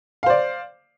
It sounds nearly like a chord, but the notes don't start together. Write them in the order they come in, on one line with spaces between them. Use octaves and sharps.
F5 C5 D5